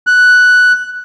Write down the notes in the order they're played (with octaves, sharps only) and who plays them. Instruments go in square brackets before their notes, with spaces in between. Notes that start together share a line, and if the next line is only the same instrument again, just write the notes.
[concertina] F#6